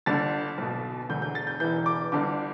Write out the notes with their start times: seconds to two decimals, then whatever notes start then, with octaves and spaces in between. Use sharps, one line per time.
0.06 G1 G2 D3 A6
0.58 B1 B2
1.09 E1 D2 D3 G6
1.22 G6
1.35 A6
1.47 G6
1.60 E1 E2 E3 G6
1.86 D6
2.12 G1 G2 D3 D6